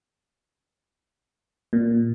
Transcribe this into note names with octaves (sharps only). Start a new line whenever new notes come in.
A#2